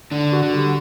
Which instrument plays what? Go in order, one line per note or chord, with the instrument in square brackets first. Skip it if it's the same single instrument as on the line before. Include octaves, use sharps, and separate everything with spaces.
[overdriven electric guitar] D3 [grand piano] D4
[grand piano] F#4
[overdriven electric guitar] D3
[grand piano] G3